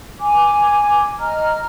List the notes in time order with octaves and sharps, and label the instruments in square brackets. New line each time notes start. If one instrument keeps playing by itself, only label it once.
[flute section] G#5 D6
D#5 A#5 F6